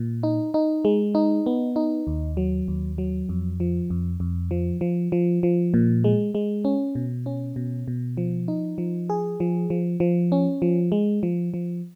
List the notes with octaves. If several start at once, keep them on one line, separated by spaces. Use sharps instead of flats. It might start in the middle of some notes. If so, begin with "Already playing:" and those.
Already playing: A#2
D#4
D#4
G#3
D#4
B3
D#4
D#2
F#3
D#2
F#3
F2
F3
F2
F2
F3
F3
F3
F3
A#2
G#3
G#3
C#4
B2
C#4
B2
B2
F3
D#4
F3
G#4
F3
F3
F3
C#4
F3
G#3
F3
F3